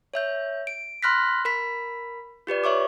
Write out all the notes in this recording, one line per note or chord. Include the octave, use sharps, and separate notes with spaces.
C#5 E5 G6
D7
B5 C6 F6 F#6 A#6 B6
A#4 B5 B6
F4 G4 B4 D5
C#5 E5 C#6 D6